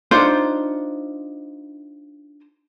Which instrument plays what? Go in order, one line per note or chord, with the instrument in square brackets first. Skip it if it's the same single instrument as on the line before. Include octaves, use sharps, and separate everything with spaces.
[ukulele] D4 D#4 F4 C5